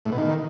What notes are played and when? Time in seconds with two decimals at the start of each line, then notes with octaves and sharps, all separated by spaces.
0.05 A2
0.12 B2
0.18 D#3